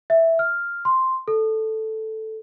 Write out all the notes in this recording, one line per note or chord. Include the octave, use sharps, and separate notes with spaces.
E5
F6
C6
A4